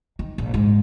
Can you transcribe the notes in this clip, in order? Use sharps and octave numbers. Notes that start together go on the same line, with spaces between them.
D#3
A#1
G#2